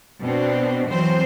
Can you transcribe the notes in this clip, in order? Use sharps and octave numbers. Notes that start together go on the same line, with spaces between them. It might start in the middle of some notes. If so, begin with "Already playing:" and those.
B2 C4 D4
E3 F#3 C4 C5